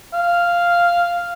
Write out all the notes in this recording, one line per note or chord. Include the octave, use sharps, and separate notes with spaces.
F5